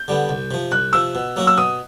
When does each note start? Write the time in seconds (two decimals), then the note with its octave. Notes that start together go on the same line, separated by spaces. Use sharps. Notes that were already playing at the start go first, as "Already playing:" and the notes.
Already playing: G6
0.08 D3 G3 B3
0.29 C2
0.51 C3 F3
0.71 C2 F#6
0.93 C3 F3 E6
1.15 B2
1.36 F#3 A#3 C#4 F#4
1.47 E6
1.58 B2 D#6